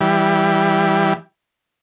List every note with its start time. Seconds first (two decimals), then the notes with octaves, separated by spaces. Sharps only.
0.01 E3 G3